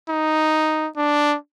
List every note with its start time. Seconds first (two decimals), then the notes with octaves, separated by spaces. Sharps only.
0.09 D#4
0.97 D4